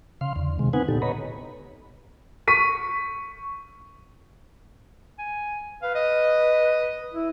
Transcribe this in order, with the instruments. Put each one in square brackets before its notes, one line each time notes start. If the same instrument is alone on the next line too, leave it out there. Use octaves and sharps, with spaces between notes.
[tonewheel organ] C#3 F5 C6
E2 D3
C3 D#3 G#3
B3 C4 D#4 B4 F#5 G#5
A#2 D3 B3 D#4 G4 A4
B4 C#5 D#5 A#5 B5
[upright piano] C#6 B6 D#7
[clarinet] G#5
[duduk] B4 [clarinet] F5
[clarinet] D#5
[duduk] E4